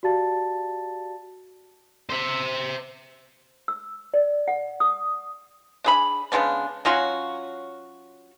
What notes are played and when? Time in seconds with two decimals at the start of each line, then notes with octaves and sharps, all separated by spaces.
0.03 F#4 G4 D5 F5 A5 A6
2.09 C5 E5
3.68 E6
4.14 D5
4.48 F#5
4.80 D#6
5.84 D4 G#4 B5
6.32 C#3 G#3 B3 D4
6.85 F#3 C#4 F4 F#4